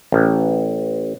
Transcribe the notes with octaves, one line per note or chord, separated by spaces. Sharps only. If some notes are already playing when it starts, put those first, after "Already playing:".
A1